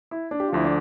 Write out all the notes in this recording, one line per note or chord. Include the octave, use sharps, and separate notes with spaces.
E4
D4
G4
F4
D2 D3 F3 E4
D4